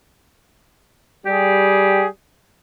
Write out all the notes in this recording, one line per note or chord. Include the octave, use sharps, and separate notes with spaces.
G3 G4 G#4